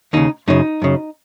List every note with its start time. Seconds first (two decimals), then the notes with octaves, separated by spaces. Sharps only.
0.13 D#2 C#3 D#4
0.48 F#2 C#3 D#4
0.82 F#2 C#3